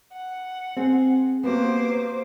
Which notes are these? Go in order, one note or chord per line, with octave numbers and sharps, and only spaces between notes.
F#5
C4 G#4
A#3 B3 F#4 G4 C5 D6